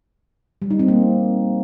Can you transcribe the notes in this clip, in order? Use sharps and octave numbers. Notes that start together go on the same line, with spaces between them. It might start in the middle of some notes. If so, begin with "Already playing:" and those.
G3
D#4
C4
A#3